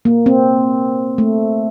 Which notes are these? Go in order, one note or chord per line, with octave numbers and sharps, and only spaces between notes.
A#3
C4
A3